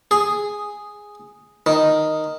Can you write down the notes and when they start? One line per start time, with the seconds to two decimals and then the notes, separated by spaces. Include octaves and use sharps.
0.11 G#4
1.66 D#3